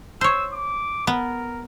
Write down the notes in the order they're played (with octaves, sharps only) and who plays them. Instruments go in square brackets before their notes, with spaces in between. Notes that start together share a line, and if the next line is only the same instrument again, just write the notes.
[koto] C5 C#5 [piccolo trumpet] E6
[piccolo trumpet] D6
[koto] B3 [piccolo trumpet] A#4